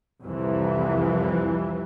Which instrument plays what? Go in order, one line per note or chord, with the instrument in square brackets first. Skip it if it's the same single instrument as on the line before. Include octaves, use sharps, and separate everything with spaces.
[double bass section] C2 F2 E3